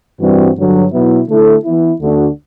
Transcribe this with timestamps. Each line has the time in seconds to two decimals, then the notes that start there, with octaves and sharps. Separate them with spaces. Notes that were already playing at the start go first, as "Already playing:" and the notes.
0.20 G2 E3 G3 C4 F#4
0.56 G2 D3 F#3
0.92 B2 F#3 B3 E4
1.27 D3 A3 E4 A4
1.64 E3 B3 E4
2.00 D2 D3 A3 D4 F#4